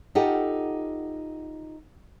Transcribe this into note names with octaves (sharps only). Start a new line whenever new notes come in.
D#4 F4 G4 A4 F#5